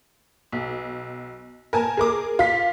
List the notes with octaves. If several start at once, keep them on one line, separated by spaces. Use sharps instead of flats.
B1
A#4 G#5 A5
G#4 A#4 D6
F4 B6